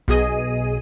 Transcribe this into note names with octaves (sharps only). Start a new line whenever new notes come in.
B1 B2 G#4 D#5 D#7